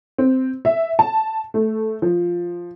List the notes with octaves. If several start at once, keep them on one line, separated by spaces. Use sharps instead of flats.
C4
E5
A5
A3
F3